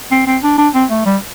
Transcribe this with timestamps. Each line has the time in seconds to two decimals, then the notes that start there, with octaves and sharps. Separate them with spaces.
0.11 C4
0.27 C4
0.43 D4
0.58 D4
0.74 C4
0.90 A3
1.06 G3